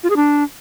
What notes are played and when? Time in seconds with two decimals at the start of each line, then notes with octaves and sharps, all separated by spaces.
0.04 F4
0.10 G#4
0.16 D4